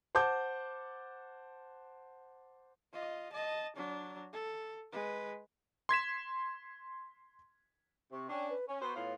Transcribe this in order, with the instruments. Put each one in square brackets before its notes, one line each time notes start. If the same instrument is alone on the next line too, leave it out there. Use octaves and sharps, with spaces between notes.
[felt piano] C5 F#5 A5 D6 G6
[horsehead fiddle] F4 D#5
D#5 A5
F#3 D4
A4
G#3 B4
[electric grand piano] C6 G#6 B6 E7
[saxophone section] C3 [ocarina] C#6
[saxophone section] C#4 D4 [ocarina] G5
[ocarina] B4
[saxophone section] C#4 [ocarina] G#5
[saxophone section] B3 F#4 C5 [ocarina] C#6
[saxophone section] A2 B3 F4 [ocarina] C#5